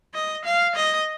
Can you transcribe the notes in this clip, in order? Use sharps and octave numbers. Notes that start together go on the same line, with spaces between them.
D#5
F5
D#5